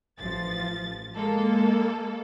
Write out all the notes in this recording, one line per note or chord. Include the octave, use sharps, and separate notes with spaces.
A1 F3 A6
G#3 A#3 A4